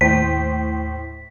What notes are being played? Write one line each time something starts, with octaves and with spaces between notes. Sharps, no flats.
D#2 A2 C5 G5 B6